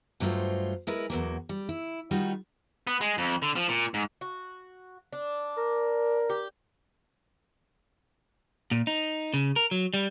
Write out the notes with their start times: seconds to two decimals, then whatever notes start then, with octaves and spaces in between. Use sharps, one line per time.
0.20 G2 F#3 A3 B3 F4 C5
0.87 G#3 E4 A#4 B4
1.10 E2 F#3 A#3
1.49 G3
1.69 E4
2.11 D#3 G3 D#4 F4 F#4
2.87 B3
3.01 G#3
3.18 F2
3.42 D3
3.56 F3
3.69 A#2
3.94 G#2
4.21 F#4
5.13 D4
5.58 A#4
6.29 G4
8.71 A#2
8.87 D#4
9.34 C#3
9.56 A#4
9.71 F#3
9.94 G3